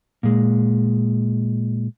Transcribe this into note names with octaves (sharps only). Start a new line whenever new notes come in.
A#2 G#3